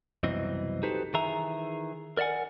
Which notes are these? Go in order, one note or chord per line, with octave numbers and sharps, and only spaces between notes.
C2 F#2 B2 E3 C4 D#5
D#4 F#4 G4 A4 B4 C5
D#3 E3 G#4 E5 A#5
A#4 D5 E5 F#5 G#5